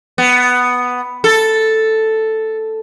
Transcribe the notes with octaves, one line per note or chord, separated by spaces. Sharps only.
B3
A4